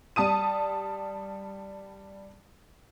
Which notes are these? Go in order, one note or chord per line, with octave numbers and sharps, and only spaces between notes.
G3 A5 D#6 D#7